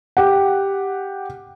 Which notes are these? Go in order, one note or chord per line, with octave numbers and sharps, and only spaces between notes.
G4 F#5